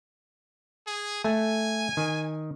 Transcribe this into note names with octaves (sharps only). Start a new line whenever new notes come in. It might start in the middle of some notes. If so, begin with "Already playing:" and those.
G#4
A3 G#5
D#3